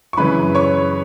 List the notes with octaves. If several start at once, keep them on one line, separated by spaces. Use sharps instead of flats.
C#6
F#2 C#3 E3 B4 B5
C#5 C#6